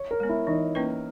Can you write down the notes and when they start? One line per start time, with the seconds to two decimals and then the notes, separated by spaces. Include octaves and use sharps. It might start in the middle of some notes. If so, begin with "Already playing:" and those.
Already playing: C#5
0.11 A#4
0.20 G#3 B3
0.29 E4
0.47 E3 D#4
0.75 A#3 C#4 E4 B4